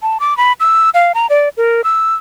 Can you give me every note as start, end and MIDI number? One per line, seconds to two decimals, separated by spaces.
0.02 0.18 81
0.20 0.36 86
0.37 0.53 83
0.60 0.90 88
0.94 1.12 77
1.15 1.27 82
1.30 1.49 74
1.57 1.82 70
1.84 2.15 88